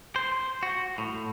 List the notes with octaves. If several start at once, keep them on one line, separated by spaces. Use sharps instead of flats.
C5
F#4
A2